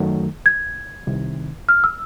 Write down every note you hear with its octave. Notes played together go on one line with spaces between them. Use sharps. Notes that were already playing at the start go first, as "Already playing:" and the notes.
Already playing: F#2 D#3 F#3 A3
G#6
C2 C3 D#3
F6
E6